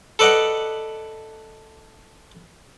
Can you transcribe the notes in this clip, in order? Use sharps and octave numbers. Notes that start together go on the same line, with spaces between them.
A4 B4 D5 D#5 F#5